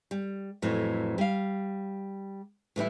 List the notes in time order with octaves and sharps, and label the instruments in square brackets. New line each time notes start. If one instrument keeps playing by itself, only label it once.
[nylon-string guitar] G3
F2 A2 E3 F#3
G3 F5
A2 E3 G3 E4